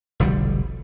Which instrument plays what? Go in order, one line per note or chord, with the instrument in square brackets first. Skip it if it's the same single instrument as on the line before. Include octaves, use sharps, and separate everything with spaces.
[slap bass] F1 B1 D3 G3